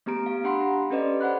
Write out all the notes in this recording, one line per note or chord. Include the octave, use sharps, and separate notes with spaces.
A3 B3 G4 A#5 D7
F5
D4 G4 F#5 B5 C6
A#5
C#4 G4 A4 B4 D5 D#5
C5 F#5 B5 F#6